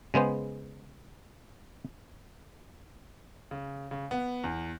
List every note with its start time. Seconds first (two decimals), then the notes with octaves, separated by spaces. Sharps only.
0.14 C#3 G#3 B3 C5
3.51 C#3
3.91 C#3
4.11 B3
4.44 E2